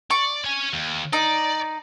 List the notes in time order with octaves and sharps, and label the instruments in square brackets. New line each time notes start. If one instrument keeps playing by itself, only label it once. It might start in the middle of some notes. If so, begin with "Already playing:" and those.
[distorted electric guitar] D5 [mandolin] C#6
[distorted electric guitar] C#5 G#5
D#2
[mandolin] D#4 [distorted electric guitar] D5